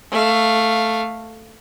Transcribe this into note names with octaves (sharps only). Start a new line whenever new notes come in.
A3 F5